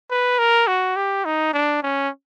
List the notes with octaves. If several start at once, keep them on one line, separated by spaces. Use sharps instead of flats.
B4
A#4
F#4
G4
D#4
D4
C#4